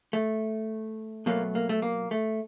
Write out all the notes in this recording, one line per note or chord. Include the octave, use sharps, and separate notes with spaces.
A3
B2 F#3 A3 A#3
A#3
A3
A#3
A3